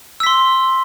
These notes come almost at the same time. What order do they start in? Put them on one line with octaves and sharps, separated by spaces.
E6 B6 C6